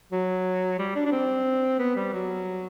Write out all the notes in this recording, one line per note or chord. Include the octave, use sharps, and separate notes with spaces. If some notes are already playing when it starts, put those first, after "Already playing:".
F#3
G3
D4
D4
C4
B3
G3
F#3